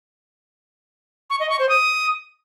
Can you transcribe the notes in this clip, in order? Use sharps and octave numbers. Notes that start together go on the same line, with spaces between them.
C#6
D#5
C#6
C5
D#6